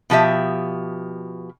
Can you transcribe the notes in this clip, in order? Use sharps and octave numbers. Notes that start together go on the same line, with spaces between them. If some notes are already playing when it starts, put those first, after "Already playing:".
B2 F3 G4 E5